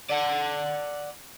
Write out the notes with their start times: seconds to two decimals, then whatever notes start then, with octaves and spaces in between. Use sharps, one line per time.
0.10 D5 F#5